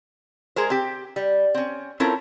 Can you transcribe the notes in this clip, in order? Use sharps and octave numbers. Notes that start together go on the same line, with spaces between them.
G#3 G#4 A#4 C5
C4 G4
G3
C4 C#4
C4 C#4 E4 F4 A4 A#4